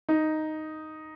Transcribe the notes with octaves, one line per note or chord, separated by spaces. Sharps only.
D#4